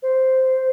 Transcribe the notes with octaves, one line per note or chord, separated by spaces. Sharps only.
C5